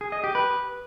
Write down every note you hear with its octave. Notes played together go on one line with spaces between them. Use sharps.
G#4
D#5
G4
B4